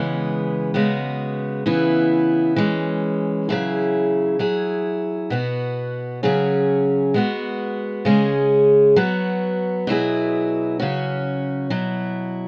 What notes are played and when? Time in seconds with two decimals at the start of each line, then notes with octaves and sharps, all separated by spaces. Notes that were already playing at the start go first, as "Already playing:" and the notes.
Already playing: C#3 E3 G#3 B3
0.74 C#3 G#3 B3 F#4
1.66 C#3 E3 B3 E4
2.56 E3 G#3 C#4
3.49 C#3 F#3 E4 G#4
4.39 F#3 E4 G#4
5.30 B2 B3 F#4
6.23 C#3 F#3 C#4 G#4
7.14 G#3 B3 F#4
8.05 C#3 G#3 C#4 G#4
8.96 F#3 B3 F#4
9.87 B2 F#3 E4 G#4
10.80 C#3 F#3 C#4 F#4
11.70 B2 F#3 E4